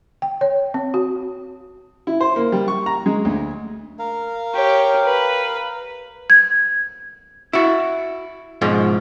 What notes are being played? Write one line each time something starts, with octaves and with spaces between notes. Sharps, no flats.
G5
C#5
C4
F#4
E4
C5
A#3
G3
C#6
A#5
G#3
D2
A#4 F5
G4 C#5
B4
G#6
E4 F#4
G#2 B2 F3